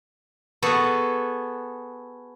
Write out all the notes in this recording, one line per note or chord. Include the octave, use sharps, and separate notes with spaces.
B3 F#4 G#4 A4